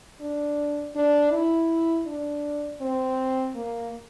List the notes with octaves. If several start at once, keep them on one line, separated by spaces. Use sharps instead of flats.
D4
D4
E4
D4
C4
A#3